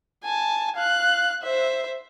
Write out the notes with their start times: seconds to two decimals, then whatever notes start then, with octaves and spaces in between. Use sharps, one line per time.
0.24 G#5 A5
0.76 F5 F#6
1.42 C5 E5